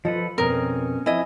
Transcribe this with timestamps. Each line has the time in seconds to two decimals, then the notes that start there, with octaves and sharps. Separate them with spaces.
0.05 F3 F4 A4 B4 D#5
0.38 F2 B2 C4 C#4 A#4 D#6
1.06 F3 C4 E4 D#5 G#5